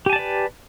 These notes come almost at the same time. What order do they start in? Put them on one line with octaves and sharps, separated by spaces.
G4 G#5 A5 D5 B4